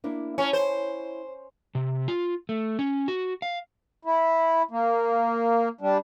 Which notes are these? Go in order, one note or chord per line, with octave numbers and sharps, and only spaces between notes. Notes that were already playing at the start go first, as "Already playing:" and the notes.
A#3 D4 E4
C#4 E4 C#5 A5
C5
C3
F4
A3
C#4
F#4
F5
E4
A#3
G3 D4